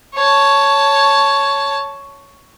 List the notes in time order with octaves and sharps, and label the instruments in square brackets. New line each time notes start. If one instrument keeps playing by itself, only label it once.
[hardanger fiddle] C#5 A5